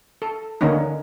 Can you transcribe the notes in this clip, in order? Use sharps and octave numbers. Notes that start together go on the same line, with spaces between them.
A4
D3 D#3 A#3 C#4 D#4